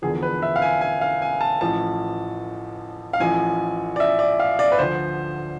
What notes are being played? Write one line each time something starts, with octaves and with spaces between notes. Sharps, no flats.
E1 E2 D3 F3 G#4
B4
E5
F5
G#5
G#5
F5
G#5
A5
A1 A2 F3 A5
F5
A1 A2 F3 G#5
D5
E5
D5
F5
D5
B4
D2 D3 F3 C5